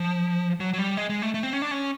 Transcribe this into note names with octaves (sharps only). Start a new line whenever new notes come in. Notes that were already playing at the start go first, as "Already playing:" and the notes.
Already playing: F3
F#3
F#3
G3
G#3
G#3
A3
A3
C4
C#4
D4
C#4